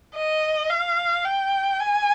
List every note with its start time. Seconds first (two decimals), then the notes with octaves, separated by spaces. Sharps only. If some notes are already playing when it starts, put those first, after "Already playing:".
0.15 D#5
0.69 F5
1.25 G5
1.80 G#5